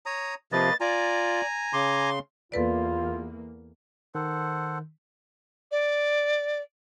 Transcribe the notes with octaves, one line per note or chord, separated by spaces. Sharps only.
C#5 A#5 D#6
C3 F3 A#3 B4 D#5 A6
F4 D5 G#5 A#5
C#3 C6 D6
E2 A#3 F4 A4 B4 D5
D#3 A4 C5 F#5
D5